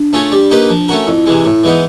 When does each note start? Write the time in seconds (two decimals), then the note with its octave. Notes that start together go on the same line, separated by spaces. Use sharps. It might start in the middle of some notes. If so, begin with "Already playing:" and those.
Already playing: D4
0.13 A3 C#4 F4 G#4
0.32 G3
0.51 A#3 D#4 G4 B4
0.69 F3
0.88 A3 C#4 F#4 A#4
1.07 F2 E4
1.26 C3 E3 G#3
1.45 A2
1.64 E3 G#3 B3 D#4